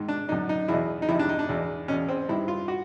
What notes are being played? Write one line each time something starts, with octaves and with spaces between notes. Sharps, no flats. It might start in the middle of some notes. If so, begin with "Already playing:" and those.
Already playing: G#2 D#3
D4
F#2 D3 D#4
D#4
E2 B2 E4
D#4
F2 C3 D#3 E4
D4
D#4
D4
E2 B2
E2 B2 C#4
C4
G2 D#3 E4
F4
F#4